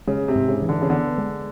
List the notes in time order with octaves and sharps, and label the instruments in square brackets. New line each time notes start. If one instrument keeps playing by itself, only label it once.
[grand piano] C#3 [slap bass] G#3
[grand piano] C3
[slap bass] G#2
[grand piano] C#3
[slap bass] E3
[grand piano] D3
C#3
[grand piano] D3 [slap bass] B3
[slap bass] G#3